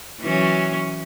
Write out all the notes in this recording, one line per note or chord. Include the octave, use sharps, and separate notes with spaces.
E3 F#3 C#4